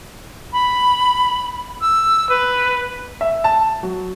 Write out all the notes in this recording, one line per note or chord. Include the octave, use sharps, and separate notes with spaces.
B5
E6
B4
E5
A5
F#3